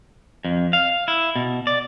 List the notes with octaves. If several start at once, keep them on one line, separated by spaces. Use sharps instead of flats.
F2
F5
E4
B2
D5